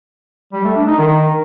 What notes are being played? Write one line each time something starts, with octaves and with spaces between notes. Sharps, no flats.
G3
A3
D4
D#4
D#3